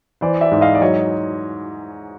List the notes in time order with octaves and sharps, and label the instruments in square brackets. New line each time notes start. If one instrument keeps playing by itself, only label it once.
[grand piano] E3 C5 D5
D5 E5
G#2
D#5 F5
D5
F#3 C#5 D#5